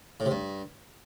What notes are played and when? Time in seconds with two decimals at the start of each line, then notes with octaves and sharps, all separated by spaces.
0.20 A2
0.26 C3
0.31 G2